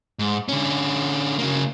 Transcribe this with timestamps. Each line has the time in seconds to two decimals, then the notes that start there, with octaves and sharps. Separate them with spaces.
0.19 G#2
0.48 D3 C#4
1.39 C#3 A#3